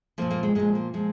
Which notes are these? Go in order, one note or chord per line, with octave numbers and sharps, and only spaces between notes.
A#2 F3 A#3
A#3
G#3
A#2 F3 G#3
A#3
A#2 F3 G#3